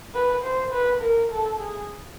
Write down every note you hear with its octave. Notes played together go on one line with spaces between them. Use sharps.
B4
C5
B4
A#4
A4
G#4